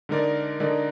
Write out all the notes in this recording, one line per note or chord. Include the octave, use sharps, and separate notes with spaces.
D3 G#3 D#4 A#4 D5
D3 G#3 D#4 A#4 D5